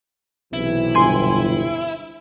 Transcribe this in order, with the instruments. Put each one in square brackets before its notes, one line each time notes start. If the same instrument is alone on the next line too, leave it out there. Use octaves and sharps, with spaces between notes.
[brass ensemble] B1 C3 E3 [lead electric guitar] E4
[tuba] G1 [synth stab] G#5 C6